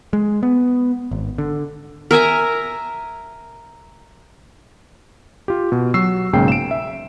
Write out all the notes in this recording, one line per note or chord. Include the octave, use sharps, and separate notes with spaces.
G#3
B3
G#1
D3
A#4 E5 G#5 A#5
F4 G4
B2
F#3 F#4 C#6 E6 C7
B1 G#2 C#3 A#3 G5 C7
D7 E7
E5